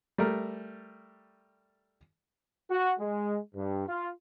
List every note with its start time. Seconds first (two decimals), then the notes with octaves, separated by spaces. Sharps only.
0.18 G3 A3 A#4
2.70 F#4
3.00 G#3
3.55 G2
3.87 F4